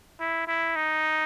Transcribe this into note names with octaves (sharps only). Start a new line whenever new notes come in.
E4
E4
D#4